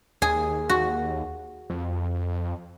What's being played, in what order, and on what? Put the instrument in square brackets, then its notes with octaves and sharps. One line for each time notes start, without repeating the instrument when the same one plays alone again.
[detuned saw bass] D#2 [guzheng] G#4
[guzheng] F#4
[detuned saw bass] F2